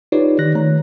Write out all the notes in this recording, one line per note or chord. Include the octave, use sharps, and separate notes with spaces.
D#4 F4 G4 B4 C#5 D5
D#3 F#6 A#6
D#3 A3 C#5 A#5